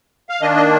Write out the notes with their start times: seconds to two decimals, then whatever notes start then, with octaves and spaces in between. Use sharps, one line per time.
0.29 F5
0.41 D#3 A#3 D4 D#5
0.56 D#5